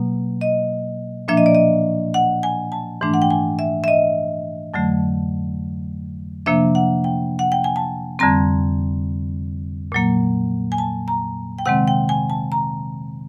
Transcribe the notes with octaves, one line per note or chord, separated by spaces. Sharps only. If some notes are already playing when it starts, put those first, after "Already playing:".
Already playing: B2 F#3 A#3
D#5
A#2 F3 A#3 D4 E5
D#5
D5
D#5
F#5
G#5
A5
G#2 E3 A3 D4
F#5
G5
G#5
E5
E5
D#5
F2 D3 F#3 A3
C3 F3 A#3 D4 E5
F#5
G5
F#5
G5
G#5
A5
F2 D3 G3 C4 A#5
A#2 F#3 A#3
G#5
A5
A#5
G5
C3 D#3 G#3 C4 F#5
G5
G#5
A5
A#5